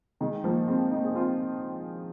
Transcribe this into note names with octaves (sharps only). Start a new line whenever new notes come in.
D#3 G#3
F3 A#3
G#3 C4
A#3 D#4
G#4
C4 F4